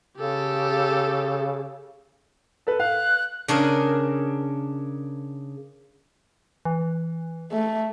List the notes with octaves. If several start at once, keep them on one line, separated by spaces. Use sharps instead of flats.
C#3 G4 A4
A4 B4
F5 F#6
C#3 D4 G#4 A#4
E3
A3